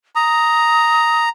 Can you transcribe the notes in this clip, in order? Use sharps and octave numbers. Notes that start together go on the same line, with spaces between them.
A#5 D#6